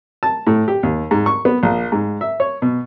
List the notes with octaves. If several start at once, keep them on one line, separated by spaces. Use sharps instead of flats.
A5
A2
G4
D#2
G#2
C#6
B3
A#1
G#2
E5
C#5
B2